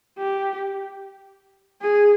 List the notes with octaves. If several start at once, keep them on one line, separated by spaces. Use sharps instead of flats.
G4
G#4